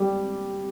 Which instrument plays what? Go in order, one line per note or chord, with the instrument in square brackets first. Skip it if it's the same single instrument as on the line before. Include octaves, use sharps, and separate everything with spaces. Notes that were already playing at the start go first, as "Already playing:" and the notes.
Already playing: [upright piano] G3 G4